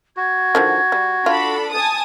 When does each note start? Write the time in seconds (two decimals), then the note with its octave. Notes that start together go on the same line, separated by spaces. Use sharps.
0.17 F#4 G#6
0.55 D3 D#3 F3
0.92 G3
1.26 D4 F4 A4 B5
1.74 G#5 A5 D#6